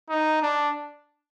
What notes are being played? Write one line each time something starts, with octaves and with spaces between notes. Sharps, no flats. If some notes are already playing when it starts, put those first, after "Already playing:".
D#4
D4